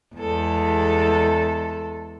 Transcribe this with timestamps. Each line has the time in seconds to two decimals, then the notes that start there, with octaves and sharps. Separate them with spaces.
0.16 E2 G#3 A4